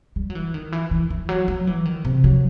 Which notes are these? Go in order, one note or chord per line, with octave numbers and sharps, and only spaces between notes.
G3
F#3
E3
D#3
E3
E3
E3
F#3
F#3
E3
D#3
C3
F#3